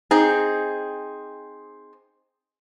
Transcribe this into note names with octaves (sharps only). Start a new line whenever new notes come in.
C4 D#4 G#4